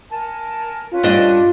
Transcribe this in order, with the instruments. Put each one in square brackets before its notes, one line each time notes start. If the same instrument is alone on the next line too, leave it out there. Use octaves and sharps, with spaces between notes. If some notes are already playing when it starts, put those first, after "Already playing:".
[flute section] A#4 G#5 A5
[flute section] C#4 B4 [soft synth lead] F4
[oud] G2 D4 D#5